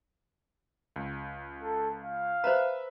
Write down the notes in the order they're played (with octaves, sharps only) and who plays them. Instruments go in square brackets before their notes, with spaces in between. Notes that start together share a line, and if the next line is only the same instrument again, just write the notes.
[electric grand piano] C#2
[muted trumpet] A4
F5
[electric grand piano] B4 E5 [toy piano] C5 A#5